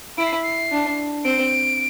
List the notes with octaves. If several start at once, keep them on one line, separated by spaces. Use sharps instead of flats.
E4 D7
C7
B6
C7
D4
C4 D7